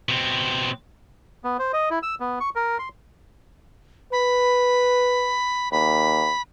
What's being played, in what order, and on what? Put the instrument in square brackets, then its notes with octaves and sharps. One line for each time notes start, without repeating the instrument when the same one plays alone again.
[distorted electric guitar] B2 C4
[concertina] B3
C5
D#5
E4
E6
B3
C#6
A#4
C6
[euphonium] B4 [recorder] B5
[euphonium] D#2 [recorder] B5